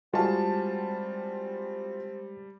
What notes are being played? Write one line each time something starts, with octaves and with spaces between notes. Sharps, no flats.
G3 G#3 C4 F4 F#4 G#5 A5